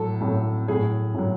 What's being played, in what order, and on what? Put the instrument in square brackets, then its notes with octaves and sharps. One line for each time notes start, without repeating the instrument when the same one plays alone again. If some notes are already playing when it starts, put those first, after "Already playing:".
Already playing: [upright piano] A2 F#3 A4
A2 F#3
A2 F#3 G#4
A2 F#3